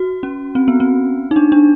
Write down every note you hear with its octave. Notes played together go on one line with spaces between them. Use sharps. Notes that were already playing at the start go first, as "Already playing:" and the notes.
Already playing: F#4
C#4
C4
B3
C4
D#4
D4
D4